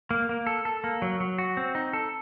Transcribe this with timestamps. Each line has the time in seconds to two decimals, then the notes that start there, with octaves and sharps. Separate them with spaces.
0.11 A#3
0.29 A#3
0.47 A4
0.65 A4
0.84 A#3
1.02 F#3
1.20 F#3
1.38 F#4
1.57 C4
1.75 D#4
1.93 A4